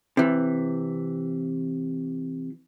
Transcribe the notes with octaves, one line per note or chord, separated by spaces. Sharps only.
C3 E3